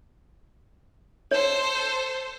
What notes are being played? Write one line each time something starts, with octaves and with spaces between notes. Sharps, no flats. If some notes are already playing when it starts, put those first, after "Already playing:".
A4 C5 C#5